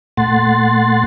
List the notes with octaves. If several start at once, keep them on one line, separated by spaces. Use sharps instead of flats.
A#2 A3 F#5 C6 A6